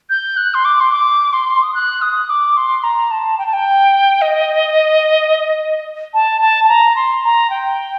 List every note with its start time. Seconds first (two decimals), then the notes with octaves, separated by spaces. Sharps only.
0.10 G6
0.37 F#6
0.54 C6
0.65 D6
0.80 C6
0.92 D6
1.33 C6
1.62 D#6
1.74 F#6
2.02 D#6
2.30 D6
2.57 C6
2.84 A#5
3.11 A5
3.38 G5
3.47 A5
3.53 G5
4.22 D#5
6.14 A5
6.41 A5
6.64 A5
6.69 A#5
6.96 C6
7.24 A#5
7.50 G5